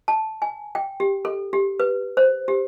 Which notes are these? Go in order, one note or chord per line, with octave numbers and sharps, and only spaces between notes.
A5
G#5
G5
G4
A4
G4
B4
C5
G4